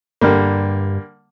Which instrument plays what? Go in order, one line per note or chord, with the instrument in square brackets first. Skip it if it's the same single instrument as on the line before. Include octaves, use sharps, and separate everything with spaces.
[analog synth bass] G2 [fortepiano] D3 G3 A#3